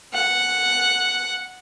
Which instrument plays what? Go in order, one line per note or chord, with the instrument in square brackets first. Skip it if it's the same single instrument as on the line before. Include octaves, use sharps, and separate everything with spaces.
[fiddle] F#5